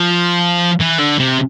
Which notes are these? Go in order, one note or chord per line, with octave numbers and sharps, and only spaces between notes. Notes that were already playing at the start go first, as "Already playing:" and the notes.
Already playing: F3
E3
D3
C3